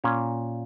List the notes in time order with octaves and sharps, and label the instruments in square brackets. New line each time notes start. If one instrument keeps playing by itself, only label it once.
[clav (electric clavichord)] A#2 C#4 C#5